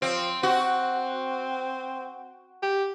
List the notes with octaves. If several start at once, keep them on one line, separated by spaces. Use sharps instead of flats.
F3 C4
C4 F#4
G4